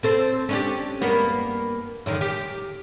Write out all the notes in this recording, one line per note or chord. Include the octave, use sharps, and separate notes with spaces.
C4 A4 C5
C#4 D4 G4
G2 A#3 B3
F#2 D3 D#3
G4